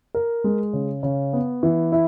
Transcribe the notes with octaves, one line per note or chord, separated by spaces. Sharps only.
A#4
G#3
C#3
C#3
B3
E3
E4